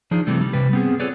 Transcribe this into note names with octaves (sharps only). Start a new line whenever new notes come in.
F3 D4 D#4 G#4
C3 E3 G3 A3
G3
C3 G3 B4
B3 C4 G#4
F4 G#4 A4 B4 C#5 D5